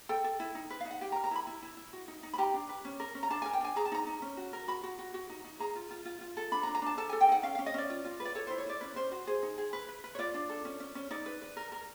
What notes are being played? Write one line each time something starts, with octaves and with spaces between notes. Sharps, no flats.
A4 G5
A4
E4
D#4
B4
F5
D#4
F#5
G4 G5
A#5
A#4
A#5
E4 B5
E4
E4
E4
F#4
D#4
D#4
B5
G4 A#5
D4
B4
C#4
A#4
C#4
A#5
D4 A5
A#4 G#5
G5
D4 G#5
G#4 A#5
A5
D#4 A#5
D#4
C#4
F#4
A#4
F#4 B5
F#4
F#4
F#4
D#4
D#4
G#4 A#5
F4
F4
F4
F4
A4
D4 B5
A#5
D4
A#5
D4 A5
A4 A5
A4 G#5
G5
D#4 F#5
C#4 F5
C#4 F5
D#5
C#4 D5
F4
F4
B4
D5
A4 C#5
E4 C5
C#5
E4 D5
C#4 B4
C#4 C5
F#4 C5
G#4 C5
D#4
G#4
B4
B4
B4
C#5
F4 D5
D4
A4
C#4
C#4
C#4
D#4 D5
B4
B4
A#4
A#4